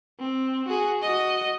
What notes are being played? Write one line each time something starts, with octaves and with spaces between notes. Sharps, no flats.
C4
F#4 G#4
F#4 D#5